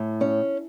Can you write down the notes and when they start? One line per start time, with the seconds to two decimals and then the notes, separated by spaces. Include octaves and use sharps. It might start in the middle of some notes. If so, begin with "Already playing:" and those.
Already playing: A2
0.21 C#4